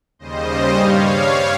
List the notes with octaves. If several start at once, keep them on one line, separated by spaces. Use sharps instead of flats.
D#2 C#3 G3 C5 D#5
G2 G3 C#5 F5